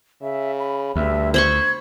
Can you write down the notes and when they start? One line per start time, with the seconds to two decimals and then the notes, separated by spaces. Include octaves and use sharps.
0.22 C#3 E5
0.59 B5
0.96 D2 G2 E5
1.34 C5 B5 C#6 G#6